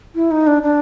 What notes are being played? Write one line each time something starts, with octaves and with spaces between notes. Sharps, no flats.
E4
D#4
D4
D4